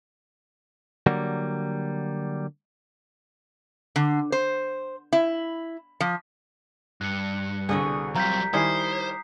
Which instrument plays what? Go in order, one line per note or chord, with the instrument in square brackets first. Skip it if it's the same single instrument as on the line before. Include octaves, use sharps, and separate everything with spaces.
[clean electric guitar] D3 F#3 G3 A#3
[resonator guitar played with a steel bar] D3
C5
E4
F3
[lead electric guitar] G2 [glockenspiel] F#6 C#7
[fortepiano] C2 [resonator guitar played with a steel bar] B2 D3 G#4
[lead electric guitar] F#3 G3 [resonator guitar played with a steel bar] C4 F4 [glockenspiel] A#5 G6 B6
[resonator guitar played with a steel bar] D#3 [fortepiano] G3 E4 G#5 [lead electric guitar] C5 [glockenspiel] D#6 C7